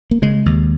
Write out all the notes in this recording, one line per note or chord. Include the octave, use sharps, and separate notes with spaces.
A#3
C#3 G#3
D#2